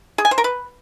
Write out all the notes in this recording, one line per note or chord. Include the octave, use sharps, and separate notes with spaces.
G#4
G#5
C5
A#4
B4